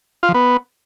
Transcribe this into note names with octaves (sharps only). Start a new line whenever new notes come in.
F4
F3
B3